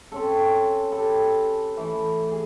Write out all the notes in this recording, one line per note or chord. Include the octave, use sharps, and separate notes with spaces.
C4 C#4 A4
G4 A4 B4
E3 A3
G#4